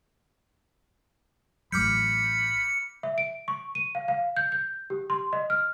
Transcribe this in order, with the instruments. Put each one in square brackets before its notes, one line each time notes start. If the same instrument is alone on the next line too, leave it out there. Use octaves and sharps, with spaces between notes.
[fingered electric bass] A1 A2 F#3 [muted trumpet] B5 [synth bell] D6 F6 G6 [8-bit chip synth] C#7
[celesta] E5
D7
C#6
D#7
F5
F5
G6
G6
G4
C6
D#5
F6